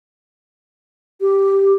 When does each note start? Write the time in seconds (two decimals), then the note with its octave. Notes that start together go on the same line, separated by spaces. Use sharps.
1.21 G4